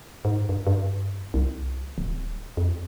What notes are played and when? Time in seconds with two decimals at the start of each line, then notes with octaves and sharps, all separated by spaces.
0.25 G#2
0.49 G2
0.67 G2
1.34 C2
1.98 D1
2.57 F2